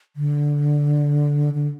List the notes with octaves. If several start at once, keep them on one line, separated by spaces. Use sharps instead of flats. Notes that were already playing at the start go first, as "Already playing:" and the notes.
D3
D3